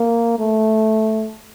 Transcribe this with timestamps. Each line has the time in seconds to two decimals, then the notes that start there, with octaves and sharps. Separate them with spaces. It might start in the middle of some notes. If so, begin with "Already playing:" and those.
Already playing: A#3
0.39 A3